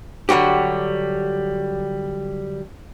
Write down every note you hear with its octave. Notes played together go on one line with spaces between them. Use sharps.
D3 F#3 G3 F#4 G4